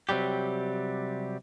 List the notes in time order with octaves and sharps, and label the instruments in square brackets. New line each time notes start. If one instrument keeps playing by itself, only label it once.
[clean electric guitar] C3 F#3 G3 G4